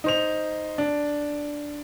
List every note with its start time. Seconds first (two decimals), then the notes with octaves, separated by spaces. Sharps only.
0.04 D#4 C5 F7
0.78 D4